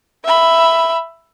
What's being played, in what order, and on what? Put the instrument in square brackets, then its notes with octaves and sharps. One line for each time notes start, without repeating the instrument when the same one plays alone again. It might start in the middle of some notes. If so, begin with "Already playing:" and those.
[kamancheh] E5 B5